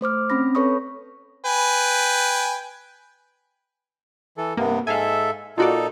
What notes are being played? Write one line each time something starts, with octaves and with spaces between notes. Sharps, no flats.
A3 C5 D6 F6
C4 C#4 B5 A#6
A4 B4 C#5 B5 C#6 D#6
B4 G5 G#5
E3 A4
G2 C3 A#3 B3
G#2 A4 E5 F5 G#5
A#2 D#4 F4 F#4 A4 D5